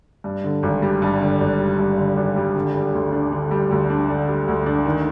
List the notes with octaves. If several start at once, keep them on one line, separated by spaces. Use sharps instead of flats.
G2
D3
G#1
G3
G2
D3
G#1
G3
G2
D3
G#1
G3
D3
G3
D2
D4
D3
G3
D2
D4
D3
G3
D2
D4
D#3